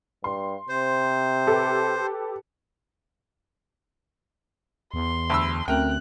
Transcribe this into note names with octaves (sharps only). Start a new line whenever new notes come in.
G2 C6
C3 C5
G4 A4 B4
E2 C6
D2 B5 E6
D2 C4 C#4 A#4 E5 G5 F#6